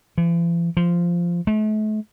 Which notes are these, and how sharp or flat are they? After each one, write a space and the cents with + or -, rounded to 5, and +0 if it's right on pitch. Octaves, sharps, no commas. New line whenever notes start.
E3 +45
F3 -10
A3 -40